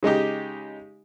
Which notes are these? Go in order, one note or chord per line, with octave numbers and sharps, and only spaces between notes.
C#3 G#3 D#4 G4